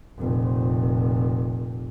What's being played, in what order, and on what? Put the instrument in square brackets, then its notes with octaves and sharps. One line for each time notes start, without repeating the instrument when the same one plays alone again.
[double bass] F1 A#2